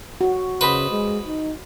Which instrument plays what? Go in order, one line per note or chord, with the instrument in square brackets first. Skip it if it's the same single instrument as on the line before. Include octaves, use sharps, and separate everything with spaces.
[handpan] F#4
[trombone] C#3 [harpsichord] B4 [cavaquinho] C5 D#5 B5
[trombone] G#3
D#4